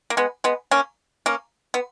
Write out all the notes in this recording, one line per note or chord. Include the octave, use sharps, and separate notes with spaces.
A#3
G#3 B3
G#3 B3
A#3 C#4
A#3 C#4
B3